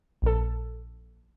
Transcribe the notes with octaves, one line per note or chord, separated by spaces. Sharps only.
A#1 A4